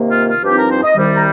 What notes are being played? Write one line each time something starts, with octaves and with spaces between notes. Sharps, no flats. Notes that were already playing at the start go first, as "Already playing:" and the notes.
Already playing: C3 D#3 A#3
F4
F4
G2 F3 C4 D#4 G4
A#4
C5
D#5
C2 C3 D#3 G3
A#5